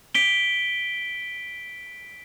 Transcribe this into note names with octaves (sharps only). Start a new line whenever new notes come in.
B6 D7 G7